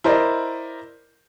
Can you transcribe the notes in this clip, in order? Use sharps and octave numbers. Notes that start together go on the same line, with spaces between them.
E4 A#4 C5 D5 D#5